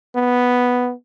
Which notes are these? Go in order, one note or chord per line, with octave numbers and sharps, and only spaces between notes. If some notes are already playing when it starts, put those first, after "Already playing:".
B3